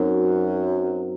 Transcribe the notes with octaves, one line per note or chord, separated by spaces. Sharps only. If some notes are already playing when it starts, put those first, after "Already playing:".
Already playing: F#2 F#3 C4 D#4